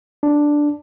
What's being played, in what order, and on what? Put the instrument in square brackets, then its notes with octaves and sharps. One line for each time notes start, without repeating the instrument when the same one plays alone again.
[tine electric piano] D4